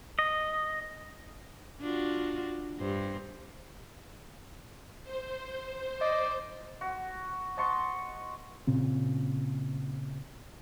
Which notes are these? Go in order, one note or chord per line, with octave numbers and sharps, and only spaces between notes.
D#5
D4 F4 F#4
G2 C5
C5
D5 D#5
F#4
D#5 A5 C6 C#6
A#2 C#3 C4